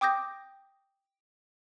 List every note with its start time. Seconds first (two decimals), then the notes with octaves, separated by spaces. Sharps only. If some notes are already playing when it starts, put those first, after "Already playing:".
0.01 G5 D6 D#6 G6 A#6